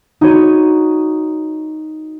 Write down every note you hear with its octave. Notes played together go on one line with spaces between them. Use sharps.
D#4 F#4 C#5 D#7